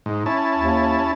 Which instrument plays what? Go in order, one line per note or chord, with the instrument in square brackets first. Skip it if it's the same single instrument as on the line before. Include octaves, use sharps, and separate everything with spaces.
[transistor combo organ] G#2
C#4 E4 A5
[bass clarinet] D#2